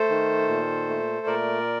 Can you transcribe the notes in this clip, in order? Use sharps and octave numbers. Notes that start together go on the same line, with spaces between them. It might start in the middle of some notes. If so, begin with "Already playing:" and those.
Already playing: A3 A4 C5
D#3
A#2
A3
A#2 A#4 D5